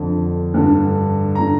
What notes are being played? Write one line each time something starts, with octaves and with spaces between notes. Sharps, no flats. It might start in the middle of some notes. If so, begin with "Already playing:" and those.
Already playing: F2 D3
G2 D3
D3 A#5